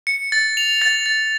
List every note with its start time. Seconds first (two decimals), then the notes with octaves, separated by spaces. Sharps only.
0.07 C#7
0.32 A6
0.57 F7
0.82 A6
1.06 A6